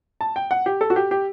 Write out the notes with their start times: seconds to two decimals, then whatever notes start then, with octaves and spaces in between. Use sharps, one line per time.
0.21 A5
0.36 G5
0.51 F#5
0.66 G4
0.81 A4
0.90 F#4
0.96 G4
1.11 G4